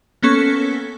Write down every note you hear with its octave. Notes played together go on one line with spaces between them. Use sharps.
A#3 B3 C#4 A4 C#6 B6